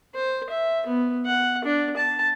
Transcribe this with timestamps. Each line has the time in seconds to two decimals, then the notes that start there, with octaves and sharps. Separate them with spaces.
0.15 C5
0.49 E5
0.86 B3
1.25 F#5
1.64 D4
1.96 A5